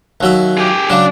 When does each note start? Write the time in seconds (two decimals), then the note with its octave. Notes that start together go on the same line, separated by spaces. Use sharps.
0.21 D#2 F#3 E5
0.58 G4 G#4
0.90 C#3 F#3 D4 D5